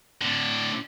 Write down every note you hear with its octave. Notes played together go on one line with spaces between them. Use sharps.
A2 D3